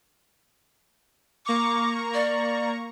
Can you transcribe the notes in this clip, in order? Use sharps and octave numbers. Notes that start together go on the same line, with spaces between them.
A#3 A#5 C#6 D6
D5